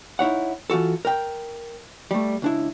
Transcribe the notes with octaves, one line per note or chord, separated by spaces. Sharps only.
D#4 E4 C#5 F#5
E3 F4 F#4 A4
A#4 G5
G3 A3
C#2 D4 E4